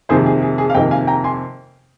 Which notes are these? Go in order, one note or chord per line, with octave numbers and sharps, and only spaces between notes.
F2 C3 D#3 A#3 G#4 C5
G#4
G#4
G#4
F5
F2 C3 D#3 A#3 D#5 G5
F5 G#5
G5 A#5
G#5 C6